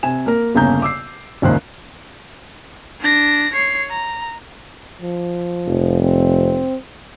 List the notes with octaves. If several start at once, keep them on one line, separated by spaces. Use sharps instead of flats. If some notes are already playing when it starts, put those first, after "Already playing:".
C3 G#5 E7
A#3 A#4
G1 E2 C#3 A#3 A#5 G6
D6 E6 C7
F#1 C#2 A#2 D#3 C5 F#6
D4 A#6
C#5 C7
A#5
F3
F1
C4